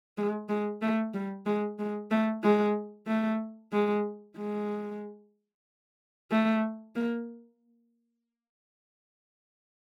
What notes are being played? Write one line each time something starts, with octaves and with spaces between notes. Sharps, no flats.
G#3
G#3
A3
G3
G#3
G#3
A3
G#3
A3
G#3
G#3
A3
A#3